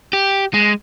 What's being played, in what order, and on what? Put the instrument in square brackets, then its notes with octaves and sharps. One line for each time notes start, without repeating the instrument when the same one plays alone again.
[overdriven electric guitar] G4
G#3